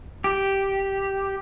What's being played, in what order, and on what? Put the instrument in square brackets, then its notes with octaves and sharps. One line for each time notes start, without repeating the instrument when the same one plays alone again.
[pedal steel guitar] G4